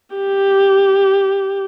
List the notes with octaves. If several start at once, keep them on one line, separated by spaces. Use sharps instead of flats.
G4